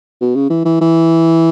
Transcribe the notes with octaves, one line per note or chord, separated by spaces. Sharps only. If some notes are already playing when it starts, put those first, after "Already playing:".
B2
C#3
E3
E3
E3